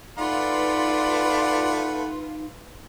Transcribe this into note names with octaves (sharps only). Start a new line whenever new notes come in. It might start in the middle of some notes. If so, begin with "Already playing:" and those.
A3 D#4 F4 B4 D5 F#5 B5